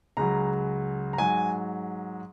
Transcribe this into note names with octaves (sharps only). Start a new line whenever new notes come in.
C#2 C#3 F#3 A#5
A#5
G#2 F#3 G#5